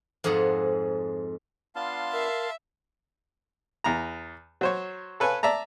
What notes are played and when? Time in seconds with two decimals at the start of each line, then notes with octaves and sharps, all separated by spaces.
0.24 F2 G#2 G#4 F#5 A#5
1.75 B3 D4 F4 F5 A5 C6
2.13 A#4 E5
3.84 E2 A#5
4.61 F#3 C5 C#5
5.20 A4 B4 C#5 F5 G#5
5.43 D5 E5 A5 A#5